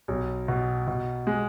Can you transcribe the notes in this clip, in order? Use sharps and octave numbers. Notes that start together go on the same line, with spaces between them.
B1
B2
B2
G#3